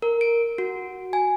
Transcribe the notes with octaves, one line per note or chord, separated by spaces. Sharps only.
A#4
D7
F#4
G#5